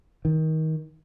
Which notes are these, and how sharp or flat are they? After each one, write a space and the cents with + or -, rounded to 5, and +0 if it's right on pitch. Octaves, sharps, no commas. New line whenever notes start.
D#3 +25